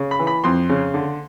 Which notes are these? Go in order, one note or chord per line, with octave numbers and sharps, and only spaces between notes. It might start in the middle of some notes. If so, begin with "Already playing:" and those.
Already playing: C#3
B5
E3
B5
F2 C6
C#3
D3